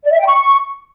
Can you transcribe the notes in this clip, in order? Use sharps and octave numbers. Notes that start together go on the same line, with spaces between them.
D5
E5
G5
C#6